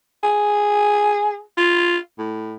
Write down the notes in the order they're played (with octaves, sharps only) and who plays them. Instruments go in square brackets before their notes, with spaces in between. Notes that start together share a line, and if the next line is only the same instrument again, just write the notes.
[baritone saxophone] G#4
F4
A2